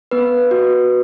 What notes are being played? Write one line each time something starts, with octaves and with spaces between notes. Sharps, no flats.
B3 B4
F#4